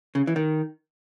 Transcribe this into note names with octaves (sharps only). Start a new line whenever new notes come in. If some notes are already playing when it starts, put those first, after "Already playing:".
C#3
E3
D#3